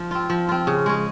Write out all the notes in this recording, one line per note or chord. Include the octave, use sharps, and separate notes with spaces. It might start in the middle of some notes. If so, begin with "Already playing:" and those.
Already playing: F3
C4 F4
F3
C4 F4
C#3
G#3 C#4